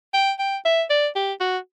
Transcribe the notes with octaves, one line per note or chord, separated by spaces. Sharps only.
G5
G5
E5
D5
G4
F#4